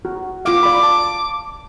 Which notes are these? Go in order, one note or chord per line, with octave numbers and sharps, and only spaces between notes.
F#4
F4 F5 D6
D5 B5
A5